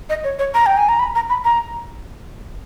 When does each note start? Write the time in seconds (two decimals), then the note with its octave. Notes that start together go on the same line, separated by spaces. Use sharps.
0.09 D#5
0.24 C#5
0.39 C#5
0.54 A#5
0.66 G5
0.77 G#5
0.89 A#5
0.99 B5
1.15 A#5
1.30 B5
1.45 A#5